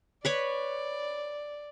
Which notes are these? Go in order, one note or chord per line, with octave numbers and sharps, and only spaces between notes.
B4 C#5 D5 B5